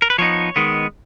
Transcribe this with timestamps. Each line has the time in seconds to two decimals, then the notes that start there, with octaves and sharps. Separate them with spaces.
0.02 A#4
0.10 B4
0.18 F3 B3 D#4 C#5
0.56 D#3 G#3 B3